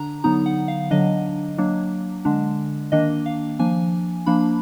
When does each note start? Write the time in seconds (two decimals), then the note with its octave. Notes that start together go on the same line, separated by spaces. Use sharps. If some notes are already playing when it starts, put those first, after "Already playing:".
Already playing: D3 D4 A#5
0.24 D3 F#3 B3 D#4 A#5
0.46 F#5
0.68 F5
0.91 D3 F#3 D4 D#5
1.58 F#3 A#3 D4
2.25 D3 G#3 D4
2.92 D#3 A#3 D4 D#5
3.26 F5
3.59 F3 A#3 D4 G#5
4.26 F3 A#3 D4 B5